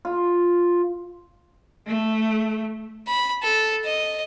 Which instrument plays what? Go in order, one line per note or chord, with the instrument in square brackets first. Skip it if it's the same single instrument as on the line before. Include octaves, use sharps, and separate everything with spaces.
[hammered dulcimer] F4
[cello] A3
[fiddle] B5
A4
D#5